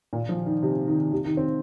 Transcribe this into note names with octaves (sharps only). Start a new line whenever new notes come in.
A#2
F3
D#3
C3
D#3
C3
D#3
C4